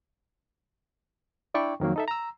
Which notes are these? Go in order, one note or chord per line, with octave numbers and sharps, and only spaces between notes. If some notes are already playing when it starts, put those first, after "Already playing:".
D4 E4 D5 G5 C#6
F2 D#3 F#3 A#3
D#4 A4 E5
A#5 E6